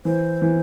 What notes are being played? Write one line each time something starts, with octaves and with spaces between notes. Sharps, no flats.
E3 C5
E3